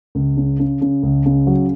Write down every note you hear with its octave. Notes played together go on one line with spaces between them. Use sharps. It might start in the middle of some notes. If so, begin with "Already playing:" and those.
C#2
C#3
C#3
C#3
C#2
C#3
F#3